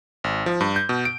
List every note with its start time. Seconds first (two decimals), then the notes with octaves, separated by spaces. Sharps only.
0.24 G#1
0.46 F3
0.61 G2
0.76 G6
0.89 B2
1.05 D7